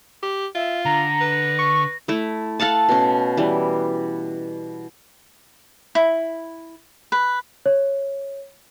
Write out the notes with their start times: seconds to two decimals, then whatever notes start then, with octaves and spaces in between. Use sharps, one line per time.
0.23 G4
0.55 F4 E5
0.85 D3 A#5 A#6
1.21 B4
1.59 C#6
2.08 A3 E4
2.60 A4 F5 F#5 A5
2.89 B2 C#4
3.37 E3 G3
5.95 E4
7.12 B4
7.66 C#5